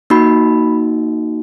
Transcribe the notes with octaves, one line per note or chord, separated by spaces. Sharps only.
A#3 D#4 F#4 B5